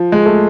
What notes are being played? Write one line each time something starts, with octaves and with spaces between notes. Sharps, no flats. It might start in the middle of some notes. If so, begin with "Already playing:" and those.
Already playing: F3
G#3
A3